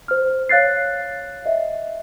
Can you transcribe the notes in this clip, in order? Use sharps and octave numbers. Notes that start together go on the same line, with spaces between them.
C5 F6
C#5 F5 F#6 A6 C7
D#5 E5